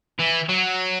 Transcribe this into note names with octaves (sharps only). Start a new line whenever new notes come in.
E3
F#3